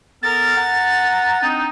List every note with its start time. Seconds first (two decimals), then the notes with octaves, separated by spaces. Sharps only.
0.23 B3 A4 A#4 A6
0.56 F#5 A#5
1.42 C4 D4 D#4